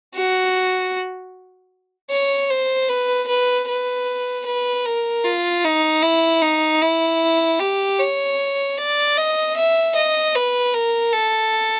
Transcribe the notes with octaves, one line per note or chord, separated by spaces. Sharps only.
F#4
C#5
C5
B4
B4
B4
B4
A#4
F4
D#4
E4
D#4
E4
G4
C#5
D5
D#5
E5
D#5
B4
A#4
A4